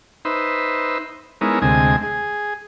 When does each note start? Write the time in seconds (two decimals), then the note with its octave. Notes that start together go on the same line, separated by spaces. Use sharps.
0.25 D#4 B4 C5 E5
1.41 G#3 B3 C#4 D#4 E4 A#4
1.62 D2 C3 G#3 D#5 G#5
2.03 G#4